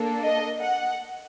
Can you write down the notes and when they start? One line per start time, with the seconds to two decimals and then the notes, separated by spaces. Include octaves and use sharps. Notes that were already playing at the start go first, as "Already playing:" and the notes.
Already playing: A#3 D4 A4
0.23 D#5
0.61 F#5